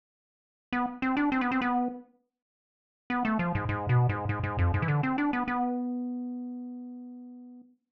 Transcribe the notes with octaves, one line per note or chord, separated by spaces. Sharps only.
B3
C4
D4
C4
B3
C4
B3
B3
A3
F3
G#2
G#2
B2
G#2
G#2
G#2
F2
G#2
E3
D3
C4
D4
B3
B3